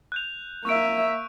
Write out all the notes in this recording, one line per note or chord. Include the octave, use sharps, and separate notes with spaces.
F#6 G6 F7
A#3 E5 C#6 D7